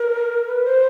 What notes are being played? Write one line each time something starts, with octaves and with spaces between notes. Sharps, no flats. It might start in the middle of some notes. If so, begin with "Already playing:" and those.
Already playing: A#4
B4
C5